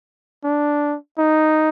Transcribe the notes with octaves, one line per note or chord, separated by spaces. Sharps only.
D4
D#4